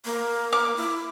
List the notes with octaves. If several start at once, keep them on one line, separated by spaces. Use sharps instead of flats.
A#3
D6
E4